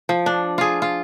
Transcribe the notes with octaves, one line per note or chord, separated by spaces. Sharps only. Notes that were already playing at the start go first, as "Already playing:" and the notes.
F3
D4
F4 G#4
F4